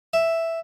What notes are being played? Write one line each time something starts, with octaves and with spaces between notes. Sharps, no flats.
E5